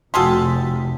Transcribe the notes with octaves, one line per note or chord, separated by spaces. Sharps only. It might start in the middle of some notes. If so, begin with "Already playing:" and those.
F1 C3 F4 F#4 G#4 A4 G5 B6